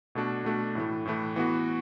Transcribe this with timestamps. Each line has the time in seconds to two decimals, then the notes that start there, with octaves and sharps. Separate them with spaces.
0.15 B2 A3 D4 F#4
0.45 B2 A3 D4 F#4
0.75 A2 E3 A3
1.05 A2 E3 A3
1.36 E3 B3 F#4